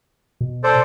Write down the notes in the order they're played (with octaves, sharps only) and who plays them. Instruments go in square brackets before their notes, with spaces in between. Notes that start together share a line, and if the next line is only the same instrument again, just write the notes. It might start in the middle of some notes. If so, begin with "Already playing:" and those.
[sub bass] B2
[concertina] A4 C5 D5